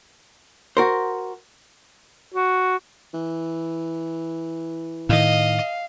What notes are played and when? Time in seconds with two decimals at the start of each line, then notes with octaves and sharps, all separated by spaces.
0.77 F#4 A#4 C5
2.34 F#4
3.14 E3
5.09 A2 D#3 D#5 F5